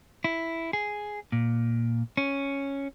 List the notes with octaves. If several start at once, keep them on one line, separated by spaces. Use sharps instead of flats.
E4
G#4
A#2
C#4